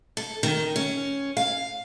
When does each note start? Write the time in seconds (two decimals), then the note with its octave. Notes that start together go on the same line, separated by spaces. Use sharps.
0.17 A4
0.43 D#3
0.76 C#4
1.37 F5